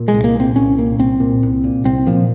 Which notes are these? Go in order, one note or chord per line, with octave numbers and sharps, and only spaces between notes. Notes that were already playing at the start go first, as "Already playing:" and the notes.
Already playing: A#2
G#3
C2
A#3
A#2 C4
C2 C#4
A#2 A#3
C2 C4
A#2
C2
A#2
C2 C4
A#2 F3